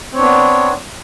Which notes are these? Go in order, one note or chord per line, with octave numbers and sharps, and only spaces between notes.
B3 C4 D4 C#5